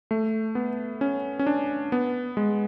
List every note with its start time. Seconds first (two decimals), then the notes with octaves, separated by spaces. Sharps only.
0.11 A3
0.55 B3
1.01 C#4
1.39 C#4
1.46 D4
1.92 B3
2.37 G#3